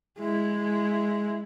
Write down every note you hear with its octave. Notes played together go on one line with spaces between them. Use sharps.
G#3 E4